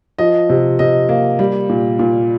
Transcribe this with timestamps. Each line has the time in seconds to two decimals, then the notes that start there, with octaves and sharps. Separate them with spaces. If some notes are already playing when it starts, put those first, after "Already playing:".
0.18 F3 D#5
0.49 C3
0.79 C3 D#5
1.09 A#3
1.39 G3
1.69 A#2
1.99 A#2